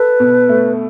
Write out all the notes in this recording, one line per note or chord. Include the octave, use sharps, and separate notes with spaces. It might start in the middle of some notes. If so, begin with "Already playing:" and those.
Already playing: A4 B4
B2
A3